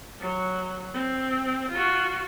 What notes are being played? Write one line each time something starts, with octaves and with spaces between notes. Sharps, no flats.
F#3
C4
F4 F#4